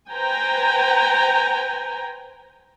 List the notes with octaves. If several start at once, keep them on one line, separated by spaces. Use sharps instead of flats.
B4 C5 G5 G#5 A#5